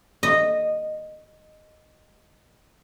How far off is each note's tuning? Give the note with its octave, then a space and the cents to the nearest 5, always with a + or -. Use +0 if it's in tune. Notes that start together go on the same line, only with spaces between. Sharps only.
D#5 -10